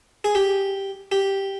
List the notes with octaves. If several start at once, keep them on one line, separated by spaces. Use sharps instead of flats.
G#4
G4
G4